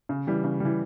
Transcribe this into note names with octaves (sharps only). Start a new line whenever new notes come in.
C#3
E3 G3
C#3
E3 G3